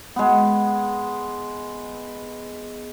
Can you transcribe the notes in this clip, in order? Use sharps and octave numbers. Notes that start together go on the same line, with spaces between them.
G#3 B3